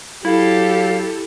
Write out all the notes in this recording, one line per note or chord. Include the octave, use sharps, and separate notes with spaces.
F#3 E4 G4 A4 F5